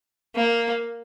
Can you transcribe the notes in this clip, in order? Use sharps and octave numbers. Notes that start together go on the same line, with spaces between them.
A#3